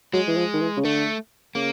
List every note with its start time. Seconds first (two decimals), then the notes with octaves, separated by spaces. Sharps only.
0.13 F#3 G#3
0.28 E3
0.37 F3
0.54 D#3
0.60 E3
0.77 C#3
0.85 D3 A3
1.55 C#3 A#3